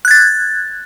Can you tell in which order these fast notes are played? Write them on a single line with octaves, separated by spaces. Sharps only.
F#6 G#6 A6